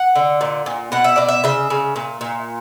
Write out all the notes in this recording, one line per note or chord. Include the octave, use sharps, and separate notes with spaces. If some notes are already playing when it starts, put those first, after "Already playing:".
Already playing: F#5
D3
A#2
A#2
B2 F#5
E5
B2 D5
E5
C#3 E5
C#3
A#2
A#2